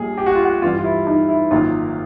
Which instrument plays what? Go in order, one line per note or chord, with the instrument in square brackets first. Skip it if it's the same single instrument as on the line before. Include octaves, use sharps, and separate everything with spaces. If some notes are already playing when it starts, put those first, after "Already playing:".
Already playing: [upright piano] A#1 A#2 G3 A#3 [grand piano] G#4
[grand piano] G4
F#4
F4
F#4
[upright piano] G2 E3 G3 [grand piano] F4
[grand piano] F4
E4
D#4
E4
[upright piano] G#1 F#2 D#3 F#3 A#3 [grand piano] F4